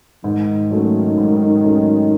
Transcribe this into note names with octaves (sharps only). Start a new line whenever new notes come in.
G#2 D#3
F#3 A3 C#4
G#2
F#3 A3 C#4